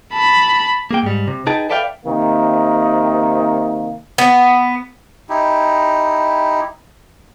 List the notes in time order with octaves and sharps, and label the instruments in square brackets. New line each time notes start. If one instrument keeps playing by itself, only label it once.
[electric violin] A5 B5
[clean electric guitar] A#3 G#4 G5
G#2 G3
C3
D#4 G#4 B4 G5 A5
A4 B4 D5 E5 F5 G5
[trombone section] C3 D#3 A#3
[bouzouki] B3
[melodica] D#4 E4 G4